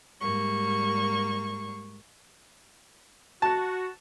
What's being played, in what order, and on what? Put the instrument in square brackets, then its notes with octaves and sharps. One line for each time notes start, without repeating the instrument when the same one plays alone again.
[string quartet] G#2 G3 A#3 C#6
[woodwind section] F#4 [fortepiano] A5